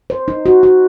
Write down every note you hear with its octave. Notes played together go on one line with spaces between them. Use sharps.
C5
D#4
F#4
F#4